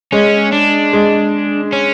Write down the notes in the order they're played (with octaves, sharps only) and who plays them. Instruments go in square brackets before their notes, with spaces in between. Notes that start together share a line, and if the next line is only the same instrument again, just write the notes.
[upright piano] G#3 [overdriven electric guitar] C#4
[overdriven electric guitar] D4
[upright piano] G#3
[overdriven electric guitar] C#4